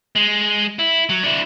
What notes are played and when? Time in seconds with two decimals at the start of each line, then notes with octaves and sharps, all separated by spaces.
0.16 G#3
0.79 E4
1.09 F#3
1.23 D4 E4